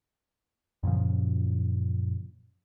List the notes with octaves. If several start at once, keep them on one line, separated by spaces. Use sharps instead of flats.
F#2 A#2 C#3 F3